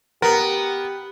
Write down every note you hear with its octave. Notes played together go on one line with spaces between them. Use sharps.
B3 G4 A#4